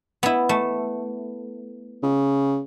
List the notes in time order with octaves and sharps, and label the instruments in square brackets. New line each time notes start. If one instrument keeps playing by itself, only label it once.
[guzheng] B3 E4
A3
[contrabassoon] C#3